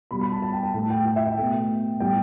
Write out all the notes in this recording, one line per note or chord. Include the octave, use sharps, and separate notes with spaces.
B2 G3 B3 B5
B5
A5
A5
G5
A5
A2 A3 A5
G5
G5
E5
G5
B2 A3
A2 G3 B3 G5